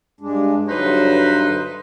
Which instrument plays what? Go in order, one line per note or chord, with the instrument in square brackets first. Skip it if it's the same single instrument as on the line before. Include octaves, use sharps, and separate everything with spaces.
[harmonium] G2 G#3 D4
[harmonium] D2 G2 F#3 [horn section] D#4 B4 C5